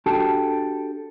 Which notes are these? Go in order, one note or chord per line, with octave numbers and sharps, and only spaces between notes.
D4 F#4 G4 A4 G5 A5